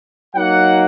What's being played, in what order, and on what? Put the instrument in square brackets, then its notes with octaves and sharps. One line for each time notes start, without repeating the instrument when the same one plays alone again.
[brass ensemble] F#3 A#3 D#4 F#5